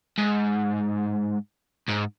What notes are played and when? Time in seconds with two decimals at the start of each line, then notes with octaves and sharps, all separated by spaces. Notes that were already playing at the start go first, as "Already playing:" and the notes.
0.18 G#2
1.89 G#2